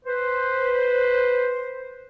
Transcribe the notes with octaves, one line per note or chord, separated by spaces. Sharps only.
B4 C5